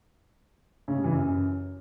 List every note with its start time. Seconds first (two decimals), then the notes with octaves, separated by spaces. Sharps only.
0.88 C#3
0.96 G3
1.04 E3
1.12 F#2